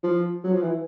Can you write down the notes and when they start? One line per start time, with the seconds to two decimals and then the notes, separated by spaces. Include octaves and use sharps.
0.03 F3
0.44 F#3
0.53 F3
0.62 E3